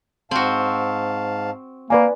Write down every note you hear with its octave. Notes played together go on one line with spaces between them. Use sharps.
G#2 C4 F#4 F5 A5
A#3 B4 D5 G#5